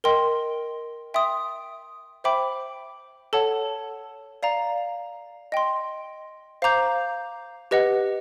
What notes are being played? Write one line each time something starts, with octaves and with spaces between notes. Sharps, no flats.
A#4 D#5 G5 C6
E5 G5 C6 D#6
C5 E5 G5 B5 D6
A4 C#5 F#5 A5
D5 F5 A#5
D#5 G5 C6
C5 F5 A#5 D6 G6
G4 B4 D#5 F#5